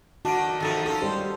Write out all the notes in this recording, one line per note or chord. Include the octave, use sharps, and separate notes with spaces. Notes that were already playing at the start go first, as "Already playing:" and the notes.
D#3 A3 D4 F#4 A5 D7
C3 D#3 F3 A3 A4 D#5
C#4 D#4 F4 A4
G3 C5